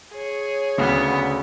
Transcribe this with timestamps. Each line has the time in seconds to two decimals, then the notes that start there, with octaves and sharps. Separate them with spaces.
0.12 G#4 C#5
0.78 D2 C#3 B3